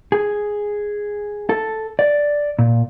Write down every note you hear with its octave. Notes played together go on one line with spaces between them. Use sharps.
G#4
A4
D5
A#2